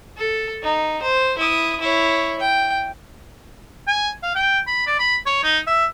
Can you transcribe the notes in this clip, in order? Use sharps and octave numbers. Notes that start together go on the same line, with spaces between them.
A4
D#4
C5
E4 D#6
E4 C#5
G5
G#5
F5
G5
B5
D5
B5
C#5
D#4
E5